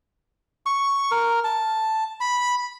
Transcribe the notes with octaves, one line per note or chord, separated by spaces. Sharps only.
C#6
A#4
A5
B5